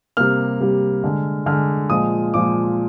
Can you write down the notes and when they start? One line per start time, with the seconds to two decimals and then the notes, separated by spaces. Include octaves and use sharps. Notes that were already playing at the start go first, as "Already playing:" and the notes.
0.17 C3 G3 A#3 F6
0.60 C3 G3 A#3
1.04 D3 G#3
1.46 D3 G#3 F6
1.90 A#2 F3 G#3 D#6
2.34 A#2 F3 G#3 D6